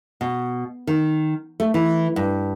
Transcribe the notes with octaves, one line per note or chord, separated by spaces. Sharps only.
B2
D#3
A3
E3
G2